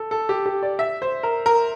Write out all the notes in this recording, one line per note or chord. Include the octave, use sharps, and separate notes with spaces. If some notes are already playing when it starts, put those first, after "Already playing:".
Already playing: A4
A4
G4
G4
D5
E5
C5
A#4
A#4